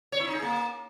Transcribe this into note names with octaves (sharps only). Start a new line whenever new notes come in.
C#5
E4
D#4
G#4
A#3